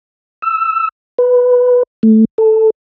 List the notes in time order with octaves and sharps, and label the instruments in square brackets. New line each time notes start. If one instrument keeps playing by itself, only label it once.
[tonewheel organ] E6
B4
A3
A4